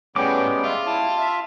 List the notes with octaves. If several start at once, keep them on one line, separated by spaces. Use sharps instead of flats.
A2 G3 G#3 B3 C#4 G5 D6
F4 E5
E4 A5
E5